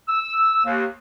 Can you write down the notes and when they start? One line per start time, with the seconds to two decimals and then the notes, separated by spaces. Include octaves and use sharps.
0.08 E6
0.64 D#2